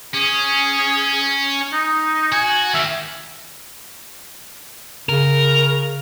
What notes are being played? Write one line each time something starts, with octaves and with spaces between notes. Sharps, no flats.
C#4 G#4
D#4
F#4 G#5
D#3 G4 E5
C#3 A#4